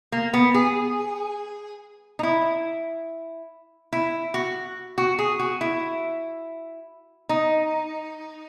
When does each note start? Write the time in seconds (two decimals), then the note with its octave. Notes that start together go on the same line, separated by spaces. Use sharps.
0.12 A#3
0.33 B3
0.54 G#4
2.19 D#4
2.23 E4
3.93 E4
4.34 F#4
4.98 F#4
5.19 G#4
5.39 F#4
5.61 E4
7.29 D#4